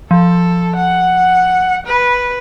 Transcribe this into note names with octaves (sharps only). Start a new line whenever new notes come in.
F3 A4
F#5
B4